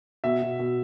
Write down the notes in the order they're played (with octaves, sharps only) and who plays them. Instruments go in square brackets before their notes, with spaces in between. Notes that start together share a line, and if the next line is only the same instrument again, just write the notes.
[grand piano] B2 E5
B2
B2